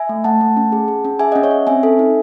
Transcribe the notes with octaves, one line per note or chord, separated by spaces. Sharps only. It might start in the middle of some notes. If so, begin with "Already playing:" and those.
Already playing: E5 G#5
A3
A3 F#5 A5
A3
C#4
G#4
G#4
C#4
G#4 E5 G#5
C#4 D#5 F#5
C#5 E5
C#4
C4 E5 G#5
A4
D#4